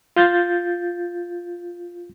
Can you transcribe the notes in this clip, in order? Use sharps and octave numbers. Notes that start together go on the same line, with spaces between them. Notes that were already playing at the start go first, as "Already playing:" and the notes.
F4 G6 A6